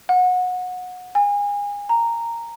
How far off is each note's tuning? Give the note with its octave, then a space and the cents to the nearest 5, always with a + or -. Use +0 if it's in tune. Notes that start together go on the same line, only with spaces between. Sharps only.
F#5 -25
G#5 -30
A#5 -10